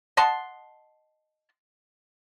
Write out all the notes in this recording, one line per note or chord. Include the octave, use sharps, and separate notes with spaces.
D#5 F#5 A5 C6